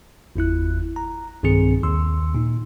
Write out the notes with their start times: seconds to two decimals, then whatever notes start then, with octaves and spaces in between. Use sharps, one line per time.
0.36 G1 E2 E4 F#6
0.96 A#5
1.43 B1 G2 D#3 C4 G#4 C#7
1.83 D#2 D#3 C6 E6
2.35 A#2 D#4